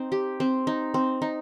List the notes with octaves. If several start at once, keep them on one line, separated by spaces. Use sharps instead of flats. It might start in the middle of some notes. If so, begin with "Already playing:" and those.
Already playing: C4 D#4
G4
C4
D#4
C4
D#4